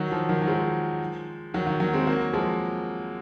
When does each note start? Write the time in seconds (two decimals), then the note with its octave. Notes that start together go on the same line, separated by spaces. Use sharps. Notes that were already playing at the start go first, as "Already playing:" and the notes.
Already playing: D#3 F#3
0.12 F3
0.29 D#3 F#3
0.42 F#3
0.47 F3 G#3
1.54 D#3 F#3
1.67 D#3 F#3
1.80 F#3 A#3
1.93 G#3 C4
2.07 F#3 A#3
2.33 F3 G#3